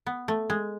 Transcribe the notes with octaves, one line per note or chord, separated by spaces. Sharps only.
B3
A3
G#3